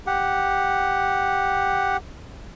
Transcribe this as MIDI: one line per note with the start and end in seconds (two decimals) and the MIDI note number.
0.07 1.97 67
0.07 1.97 78